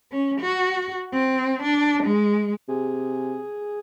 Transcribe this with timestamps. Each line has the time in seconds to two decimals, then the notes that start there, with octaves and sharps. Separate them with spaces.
0.12 C#4
0.41 F#4
1.14 C4
1.63 D4
2.03 G#3
2.68 C3 G#4